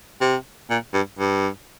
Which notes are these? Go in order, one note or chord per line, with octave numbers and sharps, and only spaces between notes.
C3
A#2
G2
G2